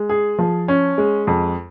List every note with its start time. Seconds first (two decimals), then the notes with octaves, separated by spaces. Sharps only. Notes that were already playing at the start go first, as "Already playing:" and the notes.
Already playing: G#3
0.09 G#4
0.39 F3
0.68 C#4
0.98 G#3
1.27 F2